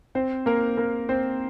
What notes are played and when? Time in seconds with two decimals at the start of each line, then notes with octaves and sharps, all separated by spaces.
0.15 C4 C5
0.46 A#3 A#4
0.77 A#3 A#4
1.09 C4 C5